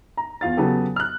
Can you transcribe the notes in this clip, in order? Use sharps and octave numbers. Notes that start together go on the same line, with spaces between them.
A#5
E2 F4 F5 A6
C#3 F#3 B3 G4 A4
F6 F#6